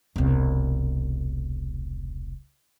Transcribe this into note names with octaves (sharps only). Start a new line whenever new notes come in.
E1 C2